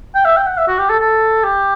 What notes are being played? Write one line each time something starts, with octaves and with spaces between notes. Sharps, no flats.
G5
E5
G5
F#5
E5
F#4
G4
A4
A4
G4